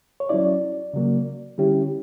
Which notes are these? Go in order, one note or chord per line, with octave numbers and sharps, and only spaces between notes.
C#5
F#3 C#4 E4 D5
C#3 F#3 A#3
D3 G3 C#4 E4 G4